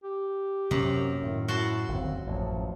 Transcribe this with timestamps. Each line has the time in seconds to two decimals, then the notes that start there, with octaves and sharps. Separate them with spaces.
0.04 G4
0.71 F#2 C3 F#3 A#3
1.23 A2 D#3
1.48 E4 F#4 A5 C6
1.88 G1 D#2 C4
2.27 A1 F#2 F3